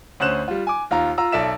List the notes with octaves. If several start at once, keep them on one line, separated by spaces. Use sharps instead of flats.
D2 C#4 C5 F#6 E7
G3 F4
G#5 D6
D#2 F4 A#5
F4 A#5 E6
B1 A4 D5 E5 E7